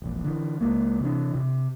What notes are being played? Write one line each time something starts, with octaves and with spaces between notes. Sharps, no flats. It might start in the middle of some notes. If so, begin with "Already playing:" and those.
E1 A#1
D3 E3
C#2 G#3 A#3
C3 E3 D4
C3